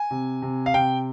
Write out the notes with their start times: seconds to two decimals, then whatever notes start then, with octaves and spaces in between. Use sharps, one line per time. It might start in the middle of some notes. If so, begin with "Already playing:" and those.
Already playing: G#5
0.11 C3
0.42 C3
0.66 F5
0.74 C3 G5